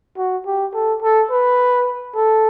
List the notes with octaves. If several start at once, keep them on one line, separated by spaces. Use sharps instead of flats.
F#4
G4
A4
A4
B4
A4